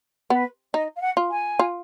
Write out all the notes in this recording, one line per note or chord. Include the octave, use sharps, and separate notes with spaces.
B3 B4
D#4 D#5
F5
F#5
F4
G#5
F4